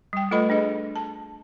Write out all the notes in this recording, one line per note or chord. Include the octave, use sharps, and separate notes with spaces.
G3 G5
A3 F4 A4 B4 D#5 B5
D4 G#4 D#5
A5